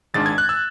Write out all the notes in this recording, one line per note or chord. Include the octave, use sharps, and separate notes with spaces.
G#1 G#2 G#3 D4 A6
G#6
F#6
E6